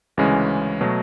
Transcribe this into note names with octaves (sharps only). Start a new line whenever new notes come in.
D2 C#3 E3 G#3 C#4
B2 F#3 A3